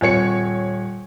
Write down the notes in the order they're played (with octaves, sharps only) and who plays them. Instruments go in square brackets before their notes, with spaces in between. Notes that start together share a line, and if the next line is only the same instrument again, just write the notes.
[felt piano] D#1 C4 C#5 C#7